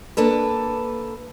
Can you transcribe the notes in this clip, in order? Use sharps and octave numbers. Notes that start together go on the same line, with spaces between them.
A#3 D4 A4 B4